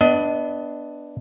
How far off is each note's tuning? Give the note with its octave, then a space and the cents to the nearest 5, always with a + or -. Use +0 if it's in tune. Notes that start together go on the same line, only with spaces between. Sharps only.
B3 +0 D4 +0 D#5 +25